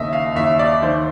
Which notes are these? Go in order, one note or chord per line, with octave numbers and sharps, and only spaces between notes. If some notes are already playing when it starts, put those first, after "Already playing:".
Already playing: D#2 C#3 D#5 E5
F5
D#2 E5
D5
D#3 C5